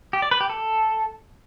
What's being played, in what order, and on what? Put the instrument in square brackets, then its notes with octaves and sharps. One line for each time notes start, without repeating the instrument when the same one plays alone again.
[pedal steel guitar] G4
D5
B4
G4
A4